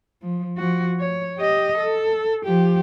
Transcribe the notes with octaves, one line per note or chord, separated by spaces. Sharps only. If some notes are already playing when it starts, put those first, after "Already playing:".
F3
F3 F#4
C#5
G4 D#5
A4
F3 G4